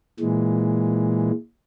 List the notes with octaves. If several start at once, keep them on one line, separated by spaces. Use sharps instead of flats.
A#2 E3 G#3